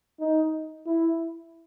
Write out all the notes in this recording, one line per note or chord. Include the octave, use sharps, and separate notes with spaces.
D#4
E4